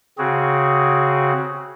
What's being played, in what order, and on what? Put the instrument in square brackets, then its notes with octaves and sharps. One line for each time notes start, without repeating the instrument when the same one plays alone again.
[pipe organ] C#3 C4 F#4 G#4